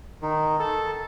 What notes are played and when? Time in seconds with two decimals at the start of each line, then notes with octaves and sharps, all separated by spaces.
0.22 D#3
0.60 A4